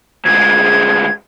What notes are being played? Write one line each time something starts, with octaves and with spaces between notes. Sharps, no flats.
D2 G#3 G#6